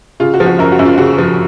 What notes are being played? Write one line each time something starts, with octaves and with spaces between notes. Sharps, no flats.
C#3 F4
F#4
F3
F#4
F#2 A#4
F#4
F#2
F4
C#3 F#4
F3